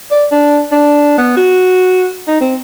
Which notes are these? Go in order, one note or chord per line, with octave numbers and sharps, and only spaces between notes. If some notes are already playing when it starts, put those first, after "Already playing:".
D5
D4
D4
B3
F#4
D#4
C4